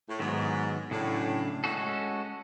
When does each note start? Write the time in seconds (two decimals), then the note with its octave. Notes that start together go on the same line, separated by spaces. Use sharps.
0.09 A2
0.19 G#2 D#3 F#3 B3
0.91 A2 C#3 F#3 A3 D4
1.64 A2 G#3 C#4 F#4 A4